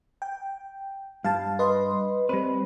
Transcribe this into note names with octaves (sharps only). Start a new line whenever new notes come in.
G5
G2 F5 A5
B4 D#5 C6
G3 C4 B4